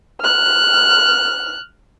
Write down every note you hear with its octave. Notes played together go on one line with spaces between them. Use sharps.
F6 F#6